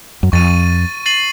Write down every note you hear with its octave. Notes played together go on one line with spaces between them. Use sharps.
F#2
F2 C#6 A6 D#7
A6 C7 D#7 F#7